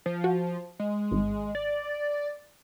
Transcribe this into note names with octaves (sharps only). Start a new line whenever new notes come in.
F3
F#4
G#3
G#1
D5